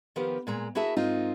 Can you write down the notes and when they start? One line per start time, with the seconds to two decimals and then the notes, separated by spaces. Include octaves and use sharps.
0.16 D#3 F3 B3 G4 A#4
0.47 A#2 G#3 A#5
0.75 E4 F#4 G#4 A#4 E5 A5
0.96 G#2 C4 D#4 F4 A#4